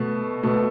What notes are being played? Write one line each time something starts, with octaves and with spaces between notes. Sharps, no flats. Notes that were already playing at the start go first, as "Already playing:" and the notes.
Already playing: B2 A3
B2 A3